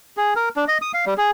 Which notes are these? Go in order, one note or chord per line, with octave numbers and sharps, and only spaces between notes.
G#4
A#4
D4
D#5
D#6
F5
G3
G#4